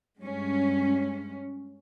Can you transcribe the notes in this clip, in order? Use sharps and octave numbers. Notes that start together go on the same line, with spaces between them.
G2 G#3 C#4